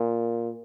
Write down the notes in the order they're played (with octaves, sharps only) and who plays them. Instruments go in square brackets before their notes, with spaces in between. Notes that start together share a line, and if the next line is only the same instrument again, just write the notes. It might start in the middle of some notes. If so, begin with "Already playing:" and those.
Already playing: [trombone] A#2